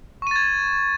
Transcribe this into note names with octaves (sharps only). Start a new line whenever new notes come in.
C#6 G#6 A6 D#7